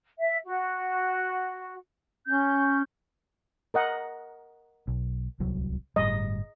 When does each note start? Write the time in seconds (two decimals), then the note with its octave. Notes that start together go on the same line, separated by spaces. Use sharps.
0.18 E5
0.43 F#4
2.26 C#4 G6
3.74 A#4 D#5 F#5
4.88 B1
5.40 D1 C2 F#3
5.96 G1 A2 G3 D#5